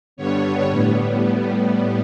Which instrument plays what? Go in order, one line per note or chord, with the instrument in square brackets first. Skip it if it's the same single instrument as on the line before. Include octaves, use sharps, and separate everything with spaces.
[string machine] G2 D3 G3 B3 C#5
A2 G3 B3